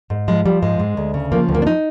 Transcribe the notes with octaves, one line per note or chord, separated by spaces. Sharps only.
G#2
F3 G#3
F3 G3
G#2 G#3
G#2
D2
C#3
F3 A#3
D2
A#3
D4
D#4